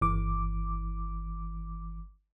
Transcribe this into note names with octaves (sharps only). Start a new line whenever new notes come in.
G1 E3 D6